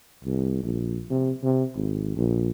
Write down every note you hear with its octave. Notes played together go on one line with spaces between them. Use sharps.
C2
A#1
C3
C3
G#1
A#1